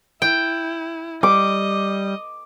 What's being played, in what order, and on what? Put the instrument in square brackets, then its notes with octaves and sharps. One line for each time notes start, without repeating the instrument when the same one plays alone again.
[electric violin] E4 [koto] G5
[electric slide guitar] G3 [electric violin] D#5 [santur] D6